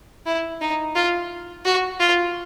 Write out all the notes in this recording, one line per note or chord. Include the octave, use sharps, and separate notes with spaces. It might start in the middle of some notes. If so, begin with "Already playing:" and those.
E4
D#4
F4
F#4
F4